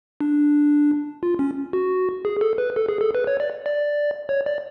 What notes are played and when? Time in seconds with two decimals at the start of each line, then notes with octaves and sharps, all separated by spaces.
0.21 D4
1.23 F4
1.39 C#4
1.73 F#4
2.25 G#4
2.41 A4
2.58 B4
2.76 A4
2.89 G#4
3.01 A4
3.15 B4
3.27 C#5
3.40 D5
3.66 D5
4.29 C#5
4.46 D5